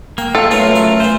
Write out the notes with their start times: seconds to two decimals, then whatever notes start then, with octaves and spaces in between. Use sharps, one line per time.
0.18 A#3 G5
0.35 F4 A4 F5
0.51 F#3 A3 B3 C#4 F4 A#4
0.71 F#2 F5
1.00 E3 B3 C5